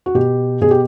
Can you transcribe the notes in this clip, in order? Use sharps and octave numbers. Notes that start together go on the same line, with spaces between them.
F#4
B2 G4
B2 G#4
G4